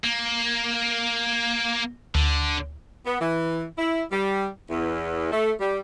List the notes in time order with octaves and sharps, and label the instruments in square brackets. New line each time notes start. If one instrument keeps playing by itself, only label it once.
[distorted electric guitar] A#3
[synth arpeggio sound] D2 [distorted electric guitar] D3
[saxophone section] B3
E3
E4
G3
E2
A3
G3